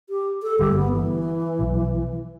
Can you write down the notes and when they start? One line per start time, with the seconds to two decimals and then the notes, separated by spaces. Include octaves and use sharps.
0.10 G4
0.43 A4
0.59 G1 G2 D3 G3 G4
0.71 A3
0.75 B3
0.92 E3
1.59 B1 B2 F#3